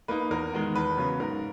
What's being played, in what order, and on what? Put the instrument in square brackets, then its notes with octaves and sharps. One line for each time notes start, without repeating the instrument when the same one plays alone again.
[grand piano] A#3 D#4 B4
E2 A#4
D#3 G#3 B3
E2 B4
C#3 F#3 B3
G#2 A#4